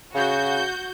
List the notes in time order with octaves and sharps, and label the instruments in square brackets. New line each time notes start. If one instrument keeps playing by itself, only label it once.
[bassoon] C#3 [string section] F#4 G6